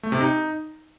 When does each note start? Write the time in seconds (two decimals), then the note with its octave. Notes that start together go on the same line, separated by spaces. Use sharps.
0.03 A3
0.12 C3
0.20 D#4